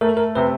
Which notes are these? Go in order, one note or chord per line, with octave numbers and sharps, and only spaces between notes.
A3 A#4
A4
A#4
C3 B4